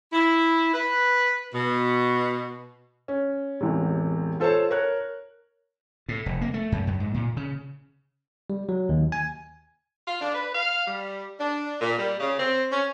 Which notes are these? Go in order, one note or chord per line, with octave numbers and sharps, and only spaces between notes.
E4
B4
B2
C#4
E1 A1 C3
F4 A4 C5 C#5 A5
A#4 C#5 F#6
A2
F1
A#3
A3
F#2
F#2
G#2
A#2
C#3
G3
F#3
D#2
G#5
F4
D4
B4
F5
G3
D4
A#2
G3
C#3
C4
C#4